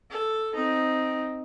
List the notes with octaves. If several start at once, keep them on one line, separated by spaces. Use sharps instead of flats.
A4
C4 D#4